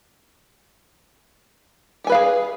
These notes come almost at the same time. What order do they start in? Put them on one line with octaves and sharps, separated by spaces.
G4 G#5 B4 F5 G#4